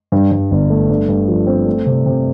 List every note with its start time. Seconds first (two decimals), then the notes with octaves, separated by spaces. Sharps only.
0.12 G2
0.32 G2
0.51 G1
0.70 A3
0.89 G2
1.08 G2
1.27 F3
1.47 C4
1.66 A3
1.86 C3
2.06 C3